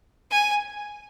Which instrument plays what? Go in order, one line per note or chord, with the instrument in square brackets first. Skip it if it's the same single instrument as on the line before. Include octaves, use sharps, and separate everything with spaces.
[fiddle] G#5